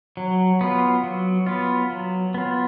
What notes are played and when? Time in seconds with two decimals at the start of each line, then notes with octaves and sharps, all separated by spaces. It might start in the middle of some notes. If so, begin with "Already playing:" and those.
0.17 F#3
0.61 B3 F4
1.04 F#3
1.46 B3 F4
1.90 F#3
2.34 B3 F4